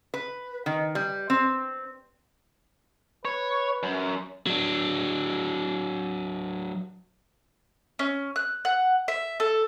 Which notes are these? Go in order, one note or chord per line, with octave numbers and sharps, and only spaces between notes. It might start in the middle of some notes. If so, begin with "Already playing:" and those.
B4
D#3
G3
C4
B4 C#5
F#2
F#3 D4
C#4
F#6
F#5
E5
A4